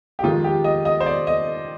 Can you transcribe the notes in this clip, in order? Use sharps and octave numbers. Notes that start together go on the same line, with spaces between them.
G4
F2 D#3 G#3 F4
G4
D#5
D#5
C5
D5
D#5